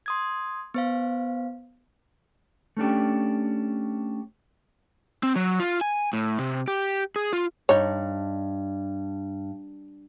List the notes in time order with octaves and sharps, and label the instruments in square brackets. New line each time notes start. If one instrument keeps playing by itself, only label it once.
[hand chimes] C6 D#6 G#6
B3 C5 F5
[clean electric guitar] A3 C#4 D4 G4
[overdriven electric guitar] C4
F#3
F4
G#5
A2
C3
G4
G#4
F4
[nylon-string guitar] G2 [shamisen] D#4 C#5